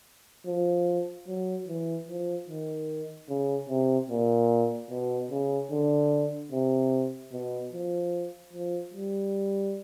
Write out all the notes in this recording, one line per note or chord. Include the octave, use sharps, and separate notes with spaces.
F3
F#3
E3
F3
D#3
C#3
C3
A#2
B2
C#3
D3
C3
B2
F3
F3
G3